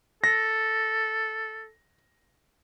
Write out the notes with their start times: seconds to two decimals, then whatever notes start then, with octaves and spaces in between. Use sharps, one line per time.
0.24 A4 A#6